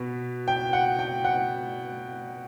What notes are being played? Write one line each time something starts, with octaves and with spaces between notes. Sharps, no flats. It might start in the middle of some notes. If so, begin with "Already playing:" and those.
Already playing: B2 B3
G5
F#5
G5
F#5